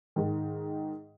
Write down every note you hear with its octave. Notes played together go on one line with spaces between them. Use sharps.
G#2 D#3